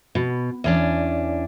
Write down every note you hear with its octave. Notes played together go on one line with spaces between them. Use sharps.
B2
E2 C#4 D4